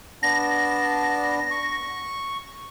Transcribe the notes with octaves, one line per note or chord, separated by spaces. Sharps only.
B3 D4 A5 A#6
C#6